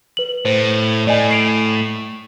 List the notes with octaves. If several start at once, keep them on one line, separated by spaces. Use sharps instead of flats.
B4 F#7
A2 C5
A2 D5 D#5 G#5
C7 D7 F7